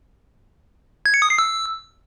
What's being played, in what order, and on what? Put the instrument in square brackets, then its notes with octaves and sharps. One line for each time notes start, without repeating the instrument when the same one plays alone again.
[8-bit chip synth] G#6
C#7
D#6
C7
E6